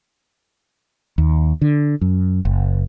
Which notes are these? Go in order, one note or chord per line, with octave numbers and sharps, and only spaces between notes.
D#2
D3
F#2
F#1